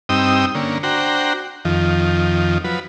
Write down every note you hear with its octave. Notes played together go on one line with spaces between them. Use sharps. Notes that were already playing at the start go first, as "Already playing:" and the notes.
G2 C4 D#4 G5 D#6 E6
D3 A#3 C#4
D4 F#4 C5 G5 A#5
F2 D#3 F3
F3 F#3 B4